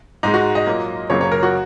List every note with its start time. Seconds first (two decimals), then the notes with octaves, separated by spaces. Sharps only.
0.23 G#2 G#3 D#4
0.34 F#4
0.55 D#5
0.66 A#2 F#3 A#3
1.10 F#2 C#3 F#3 A#3 C#5
1.21 C#5
1.32 A#4
1.43 F#4